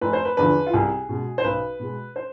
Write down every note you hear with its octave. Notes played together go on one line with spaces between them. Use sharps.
F1 B4
C5
B4
E2 D3 F3 B4
F4
C2 G#4
B2 G#3
C5
B1 B4
B2 G#3
C5